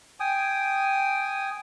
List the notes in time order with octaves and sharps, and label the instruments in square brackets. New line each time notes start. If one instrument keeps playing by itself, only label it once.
[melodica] G5 G#5 D#6